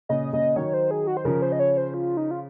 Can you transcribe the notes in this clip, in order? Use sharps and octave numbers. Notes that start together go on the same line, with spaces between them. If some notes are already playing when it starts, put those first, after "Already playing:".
A#2 C#3 D#5
A#2 C#3 D#5
D#3 F#3 C#5
C5
G#4
F#4
C5
C#3 F3 A#4
C5
D#5
C#5
C5
F4
D#4
F4